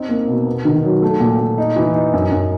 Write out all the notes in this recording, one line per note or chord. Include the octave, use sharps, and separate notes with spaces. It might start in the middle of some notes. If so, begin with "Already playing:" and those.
Already playing: C4 D#4
A#3
B2
B3
D#3
F#3
A3
A#2
A#2
D#4
E3
D#4
F#2
F#2